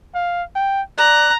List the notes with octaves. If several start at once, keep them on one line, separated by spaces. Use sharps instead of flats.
F5
G5
D5 A#5 F#6